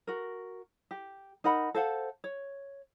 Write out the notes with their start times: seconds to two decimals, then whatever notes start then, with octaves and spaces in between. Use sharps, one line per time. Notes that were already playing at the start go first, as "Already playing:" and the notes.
0.07 F#4 A#4
0.91 G4
1.44 D#4 A#4 F#5 B5
1.74 A4 C5 F5 F#5
2.24 C#5